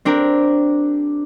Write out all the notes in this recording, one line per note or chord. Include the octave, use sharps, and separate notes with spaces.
C4 D4 G4 A#4